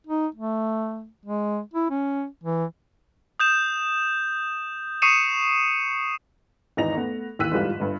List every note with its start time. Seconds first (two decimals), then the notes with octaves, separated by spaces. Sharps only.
0.07 D#4
0.35 A3
1.25 G#3
1.74 E4
1.90 C#4
2.43 E3
3.40 D#6 G6 E7
5.02 C#6 D#6 C7 C#7 D#7 E7
6.77 G#1 E2 D#4 A#5 A#6 F7
6.94 A3 B3
7.39 D#2 E3 E6 F#6 B6 D#7
7.52 G1 E2 G#2 G3 F4 E7
7.80 G1 G2